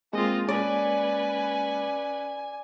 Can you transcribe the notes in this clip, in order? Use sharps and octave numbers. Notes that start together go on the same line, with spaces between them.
G#3 A#3 C4 F4 D#5
C#4 B4 D5 G#5